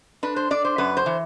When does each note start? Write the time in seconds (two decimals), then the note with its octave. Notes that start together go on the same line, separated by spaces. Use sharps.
0.23 D4 B4
0.36 C5
0.51 D4 D5
0.65 C5
0.78 F#2 B4
0.97 C5
1.06 E3